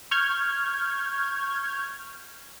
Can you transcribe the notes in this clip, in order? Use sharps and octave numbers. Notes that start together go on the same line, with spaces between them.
C#6 F6 G6 G#6